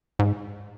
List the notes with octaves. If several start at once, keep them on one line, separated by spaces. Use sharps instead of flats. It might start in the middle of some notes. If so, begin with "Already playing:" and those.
G#2